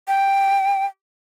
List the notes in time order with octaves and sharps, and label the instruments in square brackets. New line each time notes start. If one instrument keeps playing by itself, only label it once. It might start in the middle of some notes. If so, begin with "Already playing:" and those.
[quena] G5